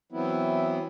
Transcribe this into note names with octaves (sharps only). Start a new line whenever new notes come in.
E3 F#3 B3 C4 E4